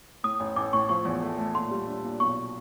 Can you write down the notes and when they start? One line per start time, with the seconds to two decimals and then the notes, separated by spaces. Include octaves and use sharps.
0.24 A2 D#6
0.40 A1
0.56 A1 D6
0.73 A2 C#6
0.89 F3 C#6
1.05 E2
1.22 A3
1.38 A3
1.55 A#2 C6
1.71 G3
1.87 D4
2.04 A#2
2.20 B1 C#6